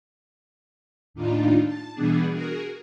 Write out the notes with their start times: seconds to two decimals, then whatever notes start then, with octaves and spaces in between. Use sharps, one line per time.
1.14 D#2 A2 D4 D#4 F4
1.65 A5
1.94 B2 E3 G3 B3 D4 G#4
2.32 F#4 G#4 A#4